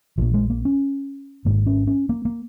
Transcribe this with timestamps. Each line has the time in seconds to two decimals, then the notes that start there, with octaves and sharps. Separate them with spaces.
0.18 A#1 A#2 F3
0.34 G#3
0.50 A#3
0.65 C#4
1.45 G#1 G#2 A#3
1.66 C#4
1.87 C#4
2.09 A#3
2.25 A#3